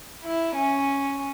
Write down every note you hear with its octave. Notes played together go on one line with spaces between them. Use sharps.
E4
C#4